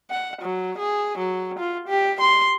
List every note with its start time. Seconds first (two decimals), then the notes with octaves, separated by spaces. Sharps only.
0.10 F#5
0.42 F#3
0.78 G#4
1.18 F#3
1.59 F4
1.88 G4
2.21 C6